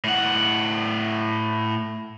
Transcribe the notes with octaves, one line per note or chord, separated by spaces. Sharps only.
A2 F#5